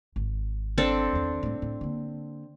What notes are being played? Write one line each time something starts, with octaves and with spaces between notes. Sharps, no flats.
G#1
C4 D4 A4
E2 D#3
A2 G3
A2
D3 A#3